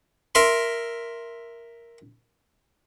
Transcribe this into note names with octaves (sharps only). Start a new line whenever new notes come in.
A#4 E5 C6